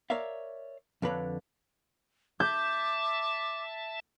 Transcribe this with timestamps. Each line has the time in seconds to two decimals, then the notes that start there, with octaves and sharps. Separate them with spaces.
0.10 A#4 C#5 D5 E5 F5
1.02 F2 D3 D4 B4 C#5 A#5
2.40 E5 A5 D6 G6